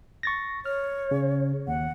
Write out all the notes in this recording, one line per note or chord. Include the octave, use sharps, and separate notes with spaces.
C#6 A6 A#6
C#5 F6
C#3
D#2 F#5